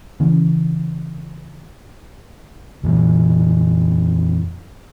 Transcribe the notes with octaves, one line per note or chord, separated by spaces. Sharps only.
C#3 E3 C#4
F2 A#2 E3